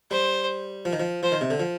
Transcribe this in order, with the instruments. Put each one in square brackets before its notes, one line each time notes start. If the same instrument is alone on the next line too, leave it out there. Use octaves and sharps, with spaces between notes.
[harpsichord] G3 [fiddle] C5
[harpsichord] F3
D#3
F3
[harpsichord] F3 [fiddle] C5
[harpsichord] D#3
C3
D3
F3